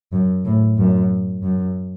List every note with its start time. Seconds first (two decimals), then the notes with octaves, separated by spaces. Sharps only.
0.12 F#2
0.45 A2
0.77 F#2
1.42 F#2